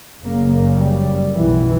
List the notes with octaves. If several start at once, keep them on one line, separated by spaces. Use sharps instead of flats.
F#1 F#2 C#3 A#3
G3
B1 B2 E3